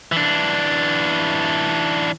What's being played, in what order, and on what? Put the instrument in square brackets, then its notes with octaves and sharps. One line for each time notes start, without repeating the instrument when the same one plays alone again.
[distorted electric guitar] E3 D4